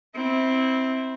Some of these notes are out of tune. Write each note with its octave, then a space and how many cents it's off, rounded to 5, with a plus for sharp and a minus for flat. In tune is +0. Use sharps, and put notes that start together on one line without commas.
C4 +0 E4 -20